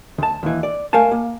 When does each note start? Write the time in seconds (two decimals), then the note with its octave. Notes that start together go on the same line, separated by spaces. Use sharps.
0.18 D2 A5
0.43 D#2 E3
0.63 D5
0.93 A3 A#4 F5 G#5 A5
1.11 A#3